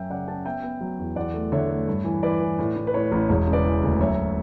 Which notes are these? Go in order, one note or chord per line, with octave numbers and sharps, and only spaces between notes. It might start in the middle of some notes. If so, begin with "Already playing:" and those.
Already playing: F#2 C#4 E5 G5
C#3 D5 F#5
C#4 F#5 A5
B3 E5 G5
B3
F#3
E2
E2 D5 F#5
A3
D3 C#5 E5
A3
G2
E3
E3 B4 D5
E3
A2
A2
B4
A2 C#5
A1
E1 C#5
C#3
B4 D5
E3
D2
F#2 C#5 E5